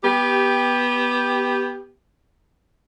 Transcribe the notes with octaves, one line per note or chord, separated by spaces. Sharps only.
B3 G4